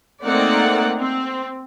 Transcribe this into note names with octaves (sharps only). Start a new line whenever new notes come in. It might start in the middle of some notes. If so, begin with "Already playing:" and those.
A3 A#3 C4 D#4 D5 F#5
C4